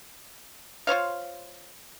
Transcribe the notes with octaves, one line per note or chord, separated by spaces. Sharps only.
F4 C5 C#5 F5